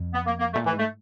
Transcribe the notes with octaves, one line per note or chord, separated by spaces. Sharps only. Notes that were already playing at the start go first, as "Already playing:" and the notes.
Already playing: F2
B3
A#3
A#3
A3
A#2
A2 E3
G#2
A3